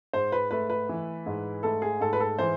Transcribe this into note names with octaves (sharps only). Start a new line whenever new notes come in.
G#2 C5
B4
A3 B4
B4
E3
G#2
A3 A4
G#4
G#2 A4
B4
A4
E3 C5